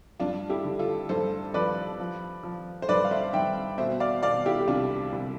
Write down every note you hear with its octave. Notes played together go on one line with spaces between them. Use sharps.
G2 D4 F4
E4 G4
D3
F4 A4
G2 A4 C5
F3 B4 D5
F3
F3
C5
G2 B4 D5
F5
C5 E5
G2 E5 G5
B2 C5 E5
D5 F5
B2 D5 F5
E4 G4
G4
C2 D4 F4
C2